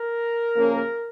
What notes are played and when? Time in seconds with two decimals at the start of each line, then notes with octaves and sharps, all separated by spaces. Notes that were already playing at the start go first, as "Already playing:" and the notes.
Already playing: A#4
0.56 C#3 F3 A#3 C#4